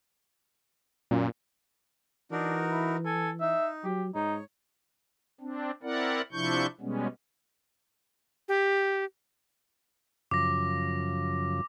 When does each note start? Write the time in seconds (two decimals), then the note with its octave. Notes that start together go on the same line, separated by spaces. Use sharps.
1.11 F#2 A#2
2.32 E3 D4 D#4 F#4 A#4
2.70 E4
3.05 A4 G#5
3.41 D#4 E5
3.84 F#3 G4
4.15 G#2 D#4 C#5
5.40 C4 D4
5.83 C4 E4 A#4 D5 F#5
6.32 C3 F3 D4 E4 C#6 G6
6.81 B2 G3 G#3 B3 C#4
8.48 G4
10.31 F#2 C#3 F3 D6 A#6